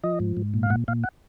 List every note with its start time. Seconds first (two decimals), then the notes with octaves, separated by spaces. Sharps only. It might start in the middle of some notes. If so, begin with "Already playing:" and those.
0.03 F3 D#5
0.20 G#2
0.37 G#2
0.54 A#2
0.63 F5
0.70 A#2 F#5
0.88 A#2 F5
1.03 F#5